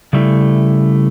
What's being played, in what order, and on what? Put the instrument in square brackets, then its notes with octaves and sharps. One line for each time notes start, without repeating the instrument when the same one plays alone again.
[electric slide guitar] C#3 G3 A3 E4